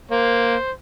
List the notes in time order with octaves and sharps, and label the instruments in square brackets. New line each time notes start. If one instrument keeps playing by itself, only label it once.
[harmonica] A#3 [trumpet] C5